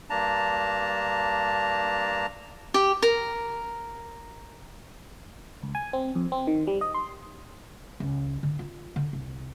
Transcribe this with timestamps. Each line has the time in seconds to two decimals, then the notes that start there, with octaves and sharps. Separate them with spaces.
0.10 G2 A#3 D4 A5 A#5
2.74 G4
3.02 A#4
5.63 C#2
5.75 G#5
5.93 C4
6.15 F2
6.32 C4
6.47 D#3
6.67 G3
6.81 D#5
6.94 C6
8.00 C#2
8.43 D3
8.59 F4
8.96 D3
9.13 C2